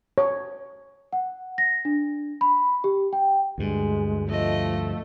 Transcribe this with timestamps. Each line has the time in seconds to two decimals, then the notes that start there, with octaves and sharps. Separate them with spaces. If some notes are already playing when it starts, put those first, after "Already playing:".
0.18 C#5
1.13 F#5
1.58 A#6
1.85 D4
2.41 B5
2.84 G4
3.13 G5
3.58 D2 G2 G#3
4.30 F3 A3 D#5